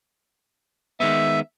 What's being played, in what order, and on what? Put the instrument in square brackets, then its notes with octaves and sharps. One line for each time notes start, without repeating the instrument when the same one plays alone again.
[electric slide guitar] D#3 G#3 B3 [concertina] E5